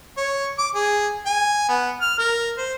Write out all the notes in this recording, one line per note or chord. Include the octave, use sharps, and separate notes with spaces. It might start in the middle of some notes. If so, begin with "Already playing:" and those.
C#5
D6
G#4
G#5
B3
F6
A#4
C5